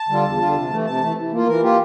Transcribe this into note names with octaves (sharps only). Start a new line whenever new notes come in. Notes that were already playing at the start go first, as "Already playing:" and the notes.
Already playing: A5
D3 G3 D4 F4
E2
D3 G3 D4 F4
C3
E3 A3
C3 A5
E3 A3
E3
A#3 F4
E3 A#4
A#3 F4 G4